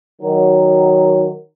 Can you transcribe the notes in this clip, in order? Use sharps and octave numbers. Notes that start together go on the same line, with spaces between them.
D#3 F#3